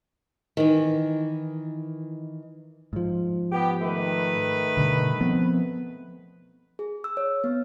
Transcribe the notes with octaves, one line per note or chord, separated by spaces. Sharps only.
D#3 E3
G#2 F3
B3 G4
D#3 A3 B4
G2 B2 D3
F3 B3 C4
G#4
E6
C#5
B3